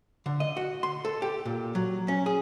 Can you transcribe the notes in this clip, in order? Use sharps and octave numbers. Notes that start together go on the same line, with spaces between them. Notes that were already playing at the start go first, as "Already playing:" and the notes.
D3
D#5
F#4
C6
A4
G4
A#2
F#3
C#4
G#4